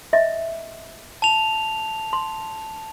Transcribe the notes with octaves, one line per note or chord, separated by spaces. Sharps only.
D#5 E5
A5 F7
C6